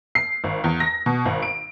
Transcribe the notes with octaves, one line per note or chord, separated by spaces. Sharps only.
C7
G#1
E2
A#6
B2
G#1
D7